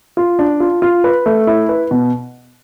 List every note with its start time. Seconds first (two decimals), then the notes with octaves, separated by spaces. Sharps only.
0.17 F4
0.39 D4
0.60 F4
0.82 F4
1.04 B4
1.26 A3
1.47 E4
1.69 B4
1.91 B2